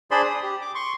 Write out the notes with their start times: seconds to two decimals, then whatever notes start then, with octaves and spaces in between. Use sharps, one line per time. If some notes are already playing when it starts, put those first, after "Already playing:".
0.11 D4 G#4 C5 D5 B5 C6
0.24 D#6
0.43 G4
0.61 D6
0.75 C6 C#6